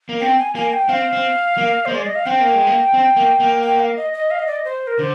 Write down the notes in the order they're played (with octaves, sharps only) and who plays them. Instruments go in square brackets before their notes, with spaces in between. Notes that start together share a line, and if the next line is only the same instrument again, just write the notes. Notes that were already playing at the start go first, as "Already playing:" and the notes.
[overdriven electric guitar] A#3
[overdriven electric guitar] C4 [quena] G5
[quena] G#5
[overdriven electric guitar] A#3 [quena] G#5
[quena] G5
[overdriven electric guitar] C4 [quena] F5
[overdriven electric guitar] C4
A#3
[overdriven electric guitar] A#3 [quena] C5
[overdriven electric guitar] G#3 [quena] D5
[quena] D#5
F5
[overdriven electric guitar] C4 [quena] G5
[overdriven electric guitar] A#3
G#3
A#3
C4
A#3
A#3
[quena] G5
F5
D#5
D#5
F5
D#5
D5
D#5
C5
A#4
[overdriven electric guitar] D3 [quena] C5